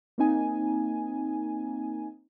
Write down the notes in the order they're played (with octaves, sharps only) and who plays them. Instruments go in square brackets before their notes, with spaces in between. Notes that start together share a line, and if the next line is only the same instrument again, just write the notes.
[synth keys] A#3 C4 D#4 G#5